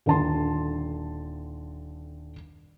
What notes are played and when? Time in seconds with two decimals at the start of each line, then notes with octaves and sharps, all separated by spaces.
0.06 D#1 D3 A5 C6